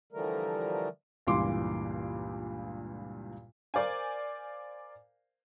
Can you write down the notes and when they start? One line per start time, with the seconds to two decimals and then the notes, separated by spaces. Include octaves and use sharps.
0.12 D3 E3 F3 G3 A3 A#4
1.27 C#2 G2 A#2 E3 C6 D6
3.74 A#4 C5 D5 F5 G#5